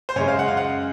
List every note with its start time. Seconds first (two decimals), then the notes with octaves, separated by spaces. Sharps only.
0.09 C5
0.16 F#2 C#3 G#3 C#5
0.28 F5
0.39 F#5
0.48 F5
0.57 F#5